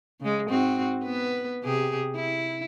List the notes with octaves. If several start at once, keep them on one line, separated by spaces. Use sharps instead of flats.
C#3 G#3
G#2 C4 F#4
B3 B4
C3 G4 G#4
E4